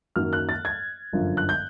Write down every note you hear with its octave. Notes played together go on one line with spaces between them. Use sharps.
F#2 D#3 F#3 A#3 F6
F#6
A6
G#6
G1 F#2 D3 F3
F#6
G6